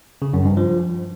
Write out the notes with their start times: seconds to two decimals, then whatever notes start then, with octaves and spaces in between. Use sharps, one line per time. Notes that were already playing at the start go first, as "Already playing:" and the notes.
0.22 C#3
0.33 F#2
0.45 G2
0.57 F3